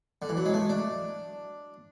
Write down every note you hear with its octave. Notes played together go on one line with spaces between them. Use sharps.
D3
E3
F#3
G#3
A3
D4